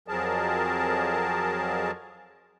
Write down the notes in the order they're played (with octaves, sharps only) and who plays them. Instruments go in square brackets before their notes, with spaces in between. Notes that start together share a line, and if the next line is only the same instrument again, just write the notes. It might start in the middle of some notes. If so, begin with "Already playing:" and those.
[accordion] F2 F3 F#3 G#4 A#4 A5